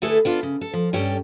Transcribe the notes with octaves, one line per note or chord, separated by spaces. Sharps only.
D2 A3 E4 G#4 A4 B4
B3 D4 F4
C#3
A4
F3
G2 G3 C#4 A4 G5